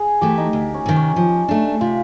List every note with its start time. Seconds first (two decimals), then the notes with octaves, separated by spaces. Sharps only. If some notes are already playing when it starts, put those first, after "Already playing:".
Already playing: G#4
0.21 E3 A3 G4
0.38 D#4
0.53 D2
0.74 C#4
0.86 C3 D#3
0.96 C#4
1.16 F3
1.48 A3 D4
1.81 C3 F4